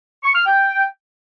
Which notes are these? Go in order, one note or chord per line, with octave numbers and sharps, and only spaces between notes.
C#6
F6
G5